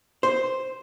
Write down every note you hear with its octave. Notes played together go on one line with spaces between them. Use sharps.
C5